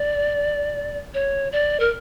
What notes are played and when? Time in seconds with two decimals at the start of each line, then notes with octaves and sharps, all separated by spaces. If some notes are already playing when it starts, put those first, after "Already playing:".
Already playing: D5
1.14 C#5
1.52 D5
1.80 A#4